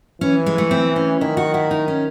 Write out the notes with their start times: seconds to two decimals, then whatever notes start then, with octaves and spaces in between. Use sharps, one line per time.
0.21 E3 C#4
0.46 G#3
0.58 A3
0.71 C4
0.96 C#4
1.21 D#3 E4
1.37 F#4
1.54 E4
1.71 D#4
1.88 C#4